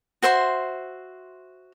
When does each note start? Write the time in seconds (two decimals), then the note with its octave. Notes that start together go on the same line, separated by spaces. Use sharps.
0.22 F#4 C5 E5 C6